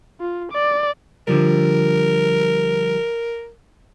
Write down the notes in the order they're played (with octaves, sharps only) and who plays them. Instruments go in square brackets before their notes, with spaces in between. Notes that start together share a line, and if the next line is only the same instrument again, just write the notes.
[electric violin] F4
D5
[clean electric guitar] D3 F3 G3 [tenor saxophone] A#4